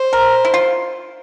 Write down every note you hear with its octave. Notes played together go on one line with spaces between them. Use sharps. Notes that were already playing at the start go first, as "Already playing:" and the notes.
Already playing: C5
A#4
E4
F4